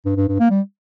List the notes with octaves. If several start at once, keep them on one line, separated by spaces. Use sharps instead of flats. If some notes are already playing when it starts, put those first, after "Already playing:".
G2
G2
G2
A#3
G3